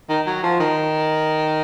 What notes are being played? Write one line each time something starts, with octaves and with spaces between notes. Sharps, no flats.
D#3
F#3
F3
D#3